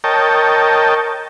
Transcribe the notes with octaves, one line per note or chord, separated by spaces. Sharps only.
A#4 C#5 D#5 G5 A5